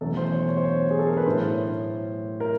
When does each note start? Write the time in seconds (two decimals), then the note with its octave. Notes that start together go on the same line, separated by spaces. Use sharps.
0.01 E2 B2 F#3 A3 C#4 A4
0.17 C5
0.32 C#5
0.48 C#5
0.57 C5
0.64 C#5
0.91 G#4
0.99 A4
1.08 A#4
1.17 B4
1.26 A2 F#3 A3 C5
2.40 A#4